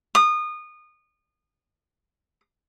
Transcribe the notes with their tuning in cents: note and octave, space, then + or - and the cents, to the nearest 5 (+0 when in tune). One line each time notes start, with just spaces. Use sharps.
D#6 -25